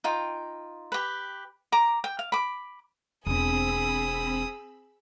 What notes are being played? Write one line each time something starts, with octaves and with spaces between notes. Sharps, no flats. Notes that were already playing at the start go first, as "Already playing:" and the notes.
D#4 F4 G5
G4 B4
A#5 D6
G5
F5
B5 D6
E1 C4 D4 G#4 B5 D#6 E6